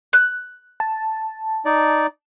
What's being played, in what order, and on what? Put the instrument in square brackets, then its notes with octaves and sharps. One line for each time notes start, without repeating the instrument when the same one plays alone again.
[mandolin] F#6
[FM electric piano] A5
[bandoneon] D#4 D5